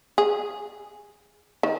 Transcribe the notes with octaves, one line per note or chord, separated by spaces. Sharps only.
G#4
D#3